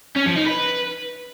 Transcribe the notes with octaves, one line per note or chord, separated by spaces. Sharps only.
C#4
F3
D#4
B4